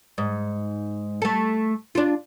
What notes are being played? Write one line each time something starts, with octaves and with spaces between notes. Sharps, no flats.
G#2
A3 A4
D4 F4